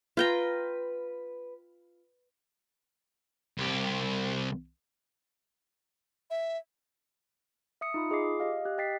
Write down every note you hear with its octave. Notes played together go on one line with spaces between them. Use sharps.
F4 B4 G5 A#5
C2 G4
E5
E5 D#6 C#7
D#4 F4 B5
F4 G#4 D#5 D6 C7
G4 D#5 F5
G4 F#6
D#5 G5 A6 B6 C7